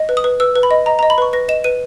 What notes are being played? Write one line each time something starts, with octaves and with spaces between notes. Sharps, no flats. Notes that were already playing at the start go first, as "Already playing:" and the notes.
Already playing: D#5
B4
D#6
B4
B4 E6
B4
B5
D#5
D#5 A#5
D#5 A#5
B5
B4 C#6
B4 A#6
D#5 E7
B4 D#7